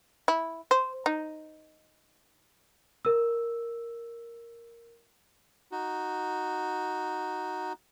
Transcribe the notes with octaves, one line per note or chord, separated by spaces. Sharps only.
E4
C5
D#4
A#4 E6
D#4 F#4